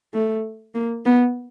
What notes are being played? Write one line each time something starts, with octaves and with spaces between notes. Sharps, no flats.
A3
A#3
B3